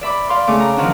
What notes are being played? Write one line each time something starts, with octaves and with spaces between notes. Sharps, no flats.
D5 E5 B5 D6
D5 F5 B5 C6
C#3 A3 D6
A#5
D#3 F3 F#3 C#4 D4